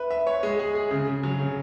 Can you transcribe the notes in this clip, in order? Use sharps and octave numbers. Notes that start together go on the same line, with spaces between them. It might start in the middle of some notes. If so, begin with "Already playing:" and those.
Already playing: B4 E5
E5
C#5
G#3
G#4
G#4
C#3
C#3
F#3
C#3